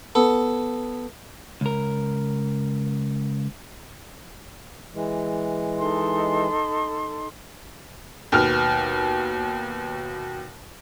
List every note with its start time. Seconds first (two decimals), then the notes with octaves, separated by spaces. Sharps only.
0.15 B3 A4
1.61 C#2 A#4
4.94 E3 G#3
5.79 D#4 A4 C6
8.32 D#2 B2 B3 F6